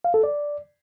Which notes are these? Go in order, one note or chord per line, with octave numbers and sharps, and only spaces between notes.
F5
A4
D5